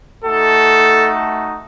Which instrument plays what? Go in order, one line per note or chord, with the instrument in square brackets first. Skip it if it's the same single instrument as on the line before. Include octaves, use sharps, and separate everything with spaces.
[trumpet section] A3 D#4 F#4 A4